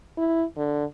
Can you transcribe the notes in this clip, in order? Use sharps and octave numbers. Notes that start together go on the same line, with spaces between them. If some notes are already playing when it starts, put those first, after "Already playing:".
E4
D3